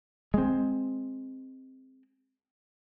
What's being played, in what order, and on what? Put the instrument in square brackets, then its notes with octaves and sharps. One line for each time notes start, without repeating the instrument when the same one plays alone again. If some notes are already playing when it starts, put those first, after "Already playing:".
[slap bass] G#3 C4